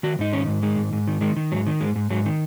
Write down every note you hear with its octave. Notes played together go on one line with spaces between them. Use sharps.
D#3 F#4
G#2 D#4
D#3 C#4
G#2
D#3 G#3
G#2
G#2
D#3
D#3 G#3
D#3
G#2 F#3
D#3
G#2 G#3
G#2
G#2 F#3
D#3